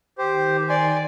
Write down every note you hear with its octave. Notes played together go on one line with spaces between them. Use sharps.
D#3 G4 C5
D5 G#5 C6